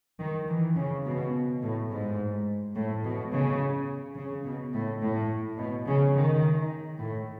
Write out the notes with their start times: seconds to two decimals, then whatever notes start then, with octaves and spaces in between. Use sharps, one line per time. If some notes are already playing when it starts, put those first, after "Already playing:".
0.20 D#3
0.49 E3
0.77 C#3
1.06 B2
1.62 A2
1.90 G#2
2.75 A2
3.04 B2
3.32 C#3
4.17 C#3
4.46 B2
4.74 A2
5.02 A2
5.58 B2
5.86 C#3
6.15 D#3
6.99 A2